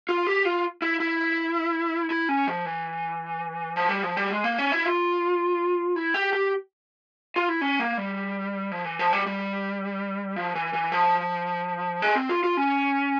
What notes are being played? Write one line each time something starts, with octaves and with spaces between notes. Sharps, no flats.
F4
G4
F4
E4
E4
E4
C#4
F3
E3
F3
G3
F3
G3
G#3
A#3
C#4
E4
F4
E4
G4
G4
F4
E4
C#4
A#3
G3
F3
E3
F3
G3
G3
F3
E3
E3
F3
G#3
C4
F4
F4
C#4